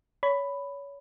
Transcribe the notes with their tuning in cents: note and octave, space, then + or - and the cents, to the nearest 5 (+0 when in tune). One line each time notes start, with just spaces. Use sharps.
C#5 +25 B5 +5